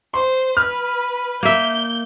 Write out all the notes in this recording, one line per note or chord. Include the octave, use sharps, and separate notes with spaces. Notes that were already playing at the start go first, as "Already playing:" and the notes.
C5 C6
B4 F6
A#3 E5 G6